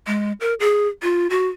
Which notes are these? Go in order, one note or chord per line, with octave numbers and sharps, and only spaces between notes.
G#3
A#4
G#4
F4
F#4